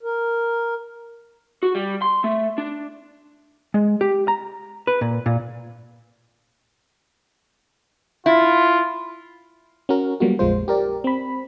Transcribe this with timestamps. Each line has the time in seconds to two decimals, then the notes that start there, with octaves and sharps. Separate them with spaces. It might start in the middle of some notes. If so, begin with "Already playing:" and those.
0.03 A#4
1.63 F#4
1.75 G3
2.02 C6
2.24 A3
2.58 D4
3.74 G#3
4.01 G4
4.28 A#5
4.87 B4
5.01 A#2
5.26 A#2
8.26 E4 F4
9.89 C#4 F#4 A#4
10.20 F#3 G3 A#3 B3 F4 F#4
10.39 A#1 F2 G#3 F4 C5
10.68 G4 A#4 D5
11.04 C4 B5